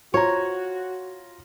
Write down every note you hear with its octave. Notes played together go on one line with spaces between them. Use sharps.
F4 F#4 C#5 A#5